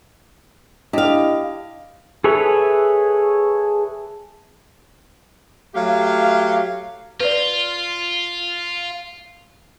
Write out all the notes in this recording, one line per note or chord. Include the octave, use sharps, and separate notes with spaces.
D4 E4 G4 D#5 F5
G#4 A4 B4 C#5 E5
F#3 A3 G4 F5
F4 B4 D5